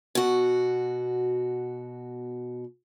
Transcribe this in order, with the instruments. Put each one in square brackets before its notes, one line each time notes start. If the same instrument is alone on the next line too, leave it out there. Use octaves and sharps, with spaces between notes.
[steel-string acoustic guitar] B2 F#4